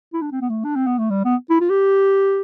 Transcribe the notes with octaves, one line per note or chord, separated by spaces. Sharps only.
E4
D4
C4
B3
A3
D4
C4
B3
A3
G3
B3
E4
F4
G4